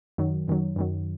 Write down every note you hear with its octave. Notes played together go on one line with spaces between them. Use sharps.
F#2 D#3 F#3
F#2 D#3 F#3
F#2 D#3 F#3